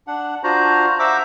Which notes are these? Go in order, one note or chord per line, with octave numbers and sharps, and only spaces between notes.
D4 F#5
D4 F4 F#4 C5 A#5
C5 E5 F#5 A#5 D6 E6